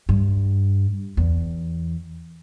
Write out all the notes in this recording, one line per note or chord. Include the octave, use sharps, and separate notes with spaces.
G2
E2